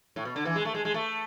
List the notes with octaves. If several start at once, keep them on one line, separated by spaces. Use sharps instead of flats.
A2
B2
D3
E3
G#3
A3
G#3
G#3
A3